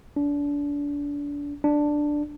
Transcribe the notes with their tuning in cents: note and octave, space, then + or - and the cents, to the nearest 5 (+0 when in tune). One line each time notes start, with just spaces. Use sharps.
D4 -30
D4 +5